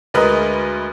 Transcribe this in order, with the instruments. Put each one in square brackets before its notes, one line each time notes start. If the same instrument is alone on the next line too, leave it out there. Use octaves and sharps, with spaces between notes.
[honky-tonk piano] D2 G#3 A#4 B4 D#5 F#6